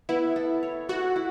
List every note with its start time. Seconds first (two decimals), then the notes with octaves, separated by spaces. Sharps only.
0.09 B3 E4
0.36 A4
0.63 C#5
0.89 F#4 A4
1.16 E4